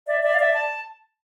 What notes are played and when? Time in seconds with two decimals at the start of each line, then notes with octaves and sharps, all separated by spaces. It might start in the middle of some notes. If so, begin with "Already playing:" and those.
0.06 D5 E5
0.22 D5 E5
0.33 F5
0.38 D5 E5
0.54 A5